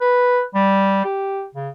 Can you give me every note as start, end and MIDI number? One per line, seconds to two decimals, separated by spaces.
0.01 0.41 71
0.55 1.04 55
1.05 1.44 67
1.55 1.69 49